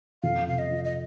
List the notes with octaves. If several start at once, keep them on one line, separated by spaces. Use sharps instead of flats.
F2 F5
C3 F5
D#5
F3
D#5